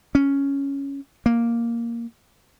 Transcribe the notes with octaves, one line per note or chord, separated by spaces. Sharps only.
C#4
A#3